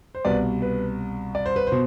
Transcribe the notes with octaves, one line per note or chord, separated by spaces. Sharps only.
C5
C2 B2 B4 D5
B4
D5
C5
B4
B2 C5